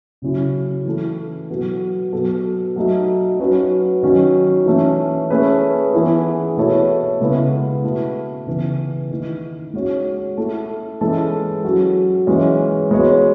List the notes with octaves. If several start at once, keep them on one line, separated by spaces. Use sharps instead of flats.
C#3 F#3 C#4 E4
E3 A3 E4 A4
B2 F#3 B3
B2 F#3 B3 F#4 A4
F#3 A3 D#4
F#3 C#4 F#4 B4
D#3 F#3 C#4
E3 A3 C#4
A3 C#4 G#4 B4
E3 B3 E4 G#4 B4
B2 A3 E4 A4 C#5
C#3 G#3 B3 E4
B2 A3 E4
C#3 E3 B3
D#3 A3 E4
G#3 C#4 F#4 C#5
A3 E4 A4
E3 G#3 C#4 E4 A4
F#3 C#4 F#4
E3 G#3 C#4
G#3 B3 F#4 C#5